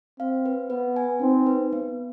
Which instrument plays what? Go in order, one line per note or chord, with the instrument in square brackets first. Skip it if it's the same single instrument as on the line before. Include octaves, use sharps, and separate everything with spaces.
[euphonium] C4 [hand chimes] F5
[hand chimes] B4
[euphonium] B3 [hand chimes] B4
[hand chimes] G#5
[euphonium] C4 [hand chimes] D#4
[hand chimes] B4
B3